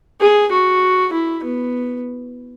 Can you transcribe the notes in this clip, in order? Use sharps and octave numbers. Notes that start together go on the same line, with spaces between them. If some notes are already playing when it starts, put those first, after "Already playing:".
G#4
F#4
E4
B3